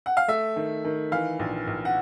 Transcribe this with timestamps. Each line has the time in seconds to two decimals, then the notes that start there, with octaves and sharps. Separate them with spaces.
0.06 F#5
0.17 F5
0.28 A3 E5
0.56 D#3
0.84 D#3
1.12 E3 F5
1.39 A#1
1.67 A#1
1.85 F#5